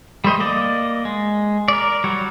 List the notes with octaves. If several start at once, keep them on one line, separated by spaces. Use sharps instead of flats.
G3 A3 C5 D#5
A#3 D5 D#5
G#3
A#4 D5
F#3 G3 C#5